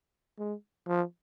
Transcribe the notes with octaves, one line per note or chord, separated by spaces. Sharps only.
G#3
F3